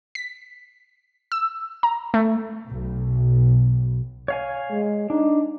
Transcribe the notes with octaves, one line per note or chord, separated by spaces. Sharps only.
B6
E6
A#5
A3
B1
C#5 F5 G#5
G#3
D4 D#4